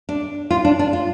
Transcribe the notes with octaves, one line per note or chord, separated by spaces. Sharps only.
D4
F4
D4
D4
F4